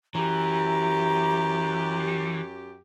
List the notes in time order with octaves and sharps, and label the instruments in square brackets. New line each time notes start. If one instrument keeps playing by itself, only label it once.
[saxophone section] F#2 G4 [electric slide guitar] E3 [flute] A#5